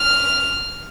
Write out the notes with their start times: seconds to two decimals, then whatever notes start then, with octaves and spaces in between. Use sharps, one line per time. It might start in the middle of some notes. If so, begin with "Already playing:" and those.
Already playing: F6